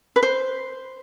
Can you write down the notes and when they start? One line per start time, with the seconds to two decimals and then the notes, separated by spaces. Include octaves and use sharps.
0.16 B4
0.23 C5